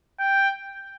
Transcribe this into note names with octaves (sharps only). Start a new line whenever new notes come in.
G5